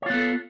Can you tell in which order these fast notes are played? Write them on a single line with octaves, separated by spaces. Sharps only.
C#5 F4 B3 A4